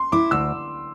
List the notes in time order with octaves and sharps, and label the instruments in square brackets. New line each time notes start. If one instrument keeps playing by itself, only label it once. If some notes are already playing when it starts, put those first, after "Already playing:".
Already playing: [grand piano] C6
[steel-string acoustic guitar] E4 [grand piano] D6
[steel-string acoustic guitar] D2 [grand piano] E6